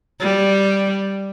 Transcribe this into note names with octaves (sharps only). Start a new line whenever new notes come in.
G3